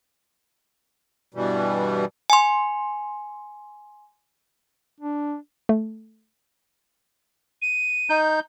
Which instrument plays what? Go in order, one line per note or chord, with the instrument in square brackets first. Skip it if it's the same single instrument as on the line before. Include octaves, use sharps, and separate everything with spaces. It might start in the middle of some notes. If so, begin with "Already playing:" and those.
[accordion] G2 B2 E3 G3
[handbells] G#5 C6
[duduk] D4
[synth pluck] A3
[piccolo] D#7
[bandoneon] D#4 G6